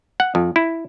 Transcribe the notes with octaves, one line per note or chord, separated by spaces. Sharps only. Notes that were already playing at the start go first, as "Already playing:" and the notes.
F#5
F2
E4